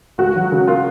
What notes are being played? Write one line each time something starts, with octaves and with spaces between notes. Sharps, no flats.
C#2 F#4
F#3
C#3
A#3 F4